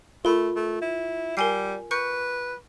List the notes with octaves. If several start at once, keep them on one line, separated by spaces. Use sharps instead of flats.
A3 F4 A#4 B5
A3
E4
G3 A#4 G#5 C7
B4 C#6 G6 C#7